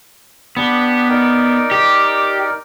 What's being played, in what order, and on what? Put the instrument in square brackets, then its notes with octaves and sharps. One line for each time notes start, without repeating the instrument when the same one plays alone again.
[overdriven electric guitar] B3 [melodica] D4 G4
[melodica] D#4 A#4 D5
[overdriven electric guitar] G4